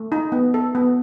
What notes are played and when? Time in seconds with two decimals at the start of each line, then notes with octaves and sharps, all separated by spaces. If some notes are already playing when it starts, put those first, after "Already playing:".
Already playing: A3
0.12 D#4
0.32 B3
0.54 A4
0.75 B3